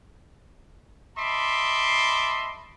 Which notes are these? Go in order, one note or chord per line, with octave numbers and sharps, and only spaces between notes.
D#5 E5 A5 B5 C6 D6